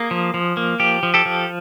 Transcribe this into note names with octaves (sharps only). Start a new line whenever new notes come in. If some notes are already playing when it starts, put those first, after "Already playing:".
Already playing: A#3 G#4
F3
F3
A#3
F3 G4
F3
G4 A4
F3